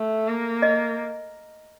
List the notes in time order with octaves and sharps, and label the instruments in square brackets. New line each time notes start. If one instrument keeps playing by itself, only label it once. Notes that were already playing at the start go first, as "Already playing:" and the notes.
Already playing: [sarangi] A3
A#3
[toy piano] D#5